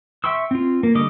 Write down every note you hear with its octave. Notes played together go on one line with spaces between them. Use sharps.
E5 G5 C6 C#6 E6
C4 F4
A#3
D3 G3 D#5 D6